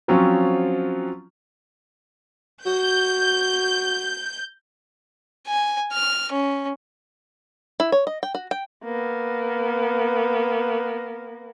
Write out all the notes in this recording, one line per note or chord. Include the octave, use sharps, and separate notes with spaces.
F3 F#3 C4 C#4 F4
F#4 G6
G#5
F6
C#4
E4
C#5
D#5
G5
F#4
G5
A#3 B3